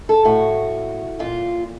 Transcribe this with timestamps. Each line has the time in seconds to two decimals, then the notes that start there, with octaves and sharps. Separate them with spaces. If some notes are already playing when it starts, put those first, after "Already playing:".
0.09 A4
0.25 A2 F#4
1.19 A#2 F4